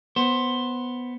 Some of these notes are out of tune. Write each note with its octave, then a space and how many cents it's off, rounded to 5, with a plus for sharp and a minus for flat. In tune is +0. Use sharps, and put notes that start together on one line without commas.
B3 +0 C5 +10